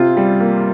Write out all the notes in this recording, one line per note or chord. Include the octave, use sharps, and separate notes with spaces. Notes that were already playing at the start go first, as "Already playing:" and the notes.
Already playing: C3 F4
G3
A#3